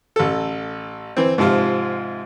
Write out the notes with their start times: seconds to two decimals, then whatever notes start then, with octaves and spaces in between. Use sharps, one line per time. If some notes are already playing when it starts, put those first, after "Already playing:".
0.16 A1 A4
1.17 E3 C4
1.38 G#2 C3 F3 F4